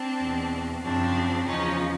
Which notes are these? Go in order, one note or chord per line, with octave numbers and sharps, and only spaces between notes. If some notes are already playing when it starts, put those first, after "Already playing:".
Already playing: C4 D4
E2 B2
F#2 C#3 F3 C4 D4
E2 C#3 F3 C#4 D#4